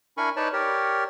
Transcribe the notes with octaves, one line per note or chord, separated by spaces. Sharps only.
D4 E4 A#4 G#5 B5 C#6
D#4 B4 C#5 D5 A5 B5
G4 A#4 C#5 D5